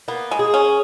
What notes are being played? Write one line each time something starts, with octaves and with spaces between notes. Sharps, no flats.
A#3 B3
G#3
G#4
C#4